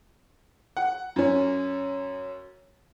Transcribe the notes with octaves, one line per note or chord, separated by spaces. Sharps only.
F#5
F#2 C#4